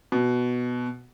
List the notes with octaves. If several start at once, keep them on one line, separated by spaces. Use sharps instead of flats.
B2